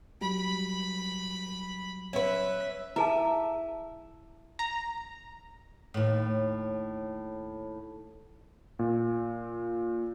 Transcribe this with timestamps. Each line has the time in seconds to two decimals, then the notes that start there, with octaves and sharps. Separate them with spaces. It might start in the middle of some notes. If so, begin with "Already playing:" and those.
0.21 F#3 G3 B5
2.13 C#4 B4 E5
2.96 E4 G#4 E5 A5
4.59 A#5
5.94 D#2 A2
8.79 A#2